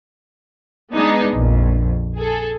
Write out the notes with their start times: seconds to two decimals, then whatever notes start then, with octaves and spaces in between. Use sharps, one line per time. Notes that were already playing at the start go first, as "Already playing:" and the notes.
0.93 G#3 B3 D4 D#4 G#4
1.33 A#1 F2
2.17 G#4 A4